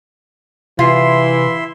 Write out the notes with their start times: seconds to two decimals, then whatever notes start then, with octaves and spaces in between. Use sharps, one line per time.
0.79 C3 E3 E4 F4 E5 C6